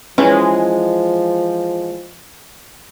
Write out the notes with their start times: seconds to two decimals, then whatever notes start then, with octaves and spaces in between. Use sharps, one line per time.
0.18 E3 F3 G#3 C#4